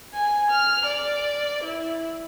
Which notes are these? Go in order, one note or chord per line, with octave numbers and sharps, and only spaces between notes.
G#5
F6
D5
E4